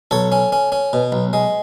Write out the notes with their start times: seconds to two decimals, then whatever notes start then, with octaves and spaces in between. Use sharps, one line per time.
0.11 B1 A4 C#5
0.32 C#4
0.52 C#4
0.72 C#4
0.93 B2
1.12 B1
1.33 G#3